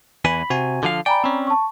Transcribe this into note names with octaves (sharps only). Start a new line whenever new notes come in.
E2 E3 G#5 B5
C3 F#4 G#5
D3 F3 F5
D5 G5 G#5 A#5 B5
C4 C#4
A5 C#6